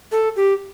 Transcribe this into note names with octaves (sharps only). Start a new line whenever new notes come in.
A4
G4